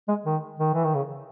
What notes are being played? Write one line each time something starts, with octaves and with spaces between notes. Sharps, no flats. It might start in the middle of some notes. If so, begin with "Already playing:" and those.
G#3
D#3
D#3
E3
D#3
C#3